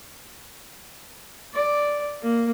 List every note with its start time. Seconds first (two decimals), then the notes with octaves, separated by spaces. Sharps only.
1.53 D5
2.23 A#3